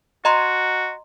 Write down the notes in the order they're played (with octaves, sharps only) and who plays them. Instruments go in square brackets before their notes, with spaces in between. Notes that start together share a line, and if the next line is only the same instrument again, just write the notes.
[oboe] F#4 [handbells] D#5 A#5 C6